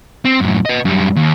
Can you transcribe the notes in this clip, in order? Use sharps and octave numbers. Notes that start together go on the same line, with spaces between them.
C4
F#2 A2
B4 D#5
F#2 G3
D#2